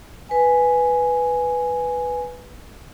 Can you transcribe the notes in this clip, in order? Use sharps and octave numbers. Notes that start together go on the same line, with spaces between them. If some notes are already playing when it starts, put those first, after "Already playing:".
B4 G#5